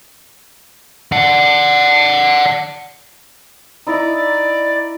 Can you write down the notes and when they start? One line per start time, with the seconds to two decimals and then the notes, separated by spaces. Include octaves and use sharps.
1.12 D5 F#5
3.87 D#4 E4 D5 D#5